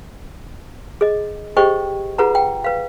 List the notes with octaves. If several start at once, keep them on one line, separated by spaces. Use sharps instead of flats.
G#4 D#5
G4 G#4 C5 D#5 G5 C#6
F4 G#4 B4 F#5 A#5
F#5 G5
B4 F5